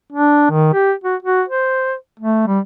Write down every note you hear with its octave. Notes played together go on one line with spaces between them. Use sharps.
D4
D#3
G4
F#4
F#4
C5
A3
G3